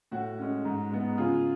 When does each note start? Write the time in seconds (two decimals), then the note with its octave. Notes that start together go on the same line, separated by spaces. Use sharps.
0.12 A2 F#4
0.38 G#3 C#4
0.65 G#2
0.90 G#3 B3
1.17 C#3 F4 G#4